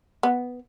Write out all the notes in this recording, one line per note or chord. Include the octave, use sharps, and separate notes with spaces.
B3